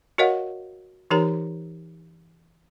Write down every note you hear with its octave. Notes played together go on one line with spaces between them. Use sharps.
F#4 A#4 C#5 D#5 F5 F#5
E3 D#4 G4 A#4 C#5 A#5